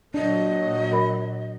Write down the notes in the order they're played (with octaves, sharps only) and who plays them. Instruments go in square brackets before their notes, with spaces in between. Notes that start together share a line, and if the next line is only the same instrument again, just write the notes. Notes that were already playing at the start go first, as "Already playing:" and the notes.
[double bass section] A#2 F#3 [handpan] D4 [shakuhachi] D#5
[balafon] F#4 A#4 B5